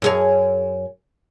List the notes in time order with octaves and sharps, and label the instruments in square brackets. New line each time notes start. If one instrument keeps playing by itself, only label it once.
[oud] F#2 G#4 C#5